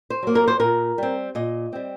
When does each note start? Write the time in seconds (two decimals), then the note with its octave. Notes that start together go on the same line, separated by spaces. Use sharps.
0.10 C5
0.23 F#3 A#3
0.35 A#4
0.48 C5
0.60 A#2 A#4
0.98 G3 C4
1.35 A#2 D#5
1.73 G3 C4